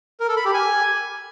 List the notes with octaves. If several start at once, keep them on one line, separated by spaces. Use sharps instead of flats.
A#4
A4
B5
G4
G#5